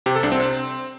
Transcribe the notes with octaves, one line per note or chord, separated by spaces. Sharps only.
C3 G4
A4
C2 D4
C4
C3